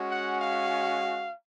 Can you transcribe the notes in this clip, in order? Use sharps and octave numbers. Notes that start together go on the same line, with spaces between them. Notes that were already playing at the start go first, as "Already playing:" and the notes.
Already playing: G#3 C#4 F#4
F#5
F5